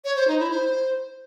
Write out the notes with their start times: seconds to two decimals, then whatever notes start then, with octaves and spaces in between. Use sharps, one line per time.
0.05 C#5
0.16 C5
0.28 D#4
0.39 E4
0.50 C5